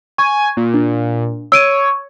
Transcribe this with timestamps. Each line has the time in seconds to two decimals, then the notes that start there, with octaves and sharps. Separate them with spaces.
0.18 G#5 C#6
0.57 A#2
0.74 D4
1.52 C#5 E6 D7 D#7